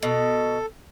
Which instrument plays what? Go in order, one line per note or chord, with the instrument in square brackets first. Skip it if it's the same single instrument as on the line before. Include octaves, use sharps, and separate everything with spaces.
[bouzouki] B2 [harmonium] A4